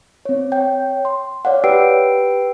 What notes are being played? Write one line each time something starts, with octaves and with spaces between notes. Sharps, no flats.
C4 C#5
C#5 G5 G6
C6
C#5 D5 F5 F#5
G4 B4 G5 E6 C7 D7